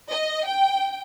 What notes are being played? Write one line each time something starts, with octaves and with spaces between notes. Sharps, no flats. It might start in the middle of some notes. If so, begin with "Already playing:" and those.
D#5
G5